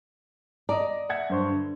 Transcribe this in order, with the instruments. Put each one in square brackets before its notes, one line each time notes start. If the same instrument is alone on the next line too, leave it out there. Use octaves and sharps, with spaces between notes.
[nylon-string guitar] D5 [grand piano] D#5 A#5
[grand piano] E5 F#5 G#6
G2 C5 C#6
D3